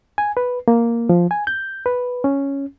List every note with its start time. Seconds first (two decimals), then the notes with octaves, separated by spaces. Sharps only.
0.18 G#5
0.37 B4
0.68 A#3
1.09 F3
1.31 G#5
1.47 G6
1.86 B4
2.24 C#4